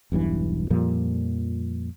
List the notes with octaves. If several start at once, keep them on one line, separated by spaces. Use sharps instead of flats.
E1 B1 G2 E3
F2 A#2 F3 G3